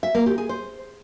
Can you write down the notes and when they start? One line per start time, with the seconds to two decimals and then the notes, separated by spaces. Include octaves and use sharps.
0.03 E5
0.15 A#3
0.26 G4
0.38 G#4
0.49 C5